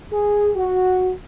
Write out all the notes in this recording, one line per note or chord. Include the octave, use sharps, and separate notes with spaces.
G#4
F#4